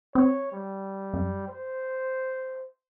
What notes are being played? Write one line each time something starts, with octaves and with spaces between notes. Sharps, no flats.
C4 C#5
G3
F#2
C5